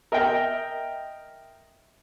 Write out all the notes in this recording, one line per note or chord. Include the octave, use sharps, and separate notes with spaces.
A#4 D#5 E5 G5